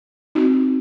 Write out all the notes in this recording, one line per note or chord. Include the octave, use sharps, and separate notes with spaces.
C4 D#4 F#4